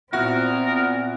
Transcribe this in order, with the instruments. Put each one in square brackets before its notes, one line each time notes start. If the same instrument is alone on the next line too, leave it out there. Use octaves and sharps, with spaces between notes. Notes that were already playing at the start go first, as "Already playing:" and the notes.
[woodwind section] A#2 B3 [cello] C4 [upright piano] E4 F#4 [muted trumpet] A#4